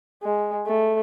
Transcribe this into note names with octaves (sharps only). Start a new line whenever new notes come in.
G#3
A3